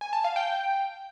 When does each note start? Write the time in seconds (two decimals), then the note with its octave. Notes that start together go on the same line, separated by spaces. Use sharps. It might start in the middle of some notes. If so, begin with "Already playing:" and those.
0.01 G#5
0.13 A5
0.24 F5
0.36 G5